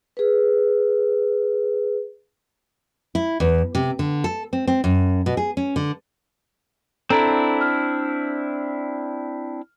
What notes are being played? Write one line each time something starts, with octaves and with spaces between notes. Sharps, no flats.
G#4 B4
E4
E2
C3
D3
A4
C4
C4
F#2
B2
G#4
C#4
D3
C4 D4 E4 A4 A#5 D7
F6